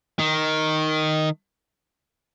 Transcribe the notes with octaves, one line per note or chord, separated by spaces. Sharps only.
D#3